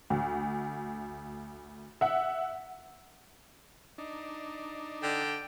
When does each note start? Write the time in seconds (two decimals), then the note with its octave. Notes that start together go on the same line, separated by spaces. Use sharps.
0.10 D2
2.01 E5 F#5
3.98 D4 D#4
5.03 D3 G5